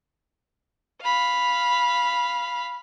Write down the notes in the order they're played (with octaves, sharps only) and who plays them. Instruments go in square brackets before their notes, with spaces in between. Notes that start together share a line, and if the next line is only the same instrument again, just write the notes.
[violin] F5 B5